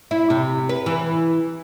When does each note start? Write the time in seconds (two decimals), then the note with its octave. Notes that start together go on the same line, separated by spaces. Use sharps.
0.11 E4
0.30 C3
0.69 B4
0.86 E3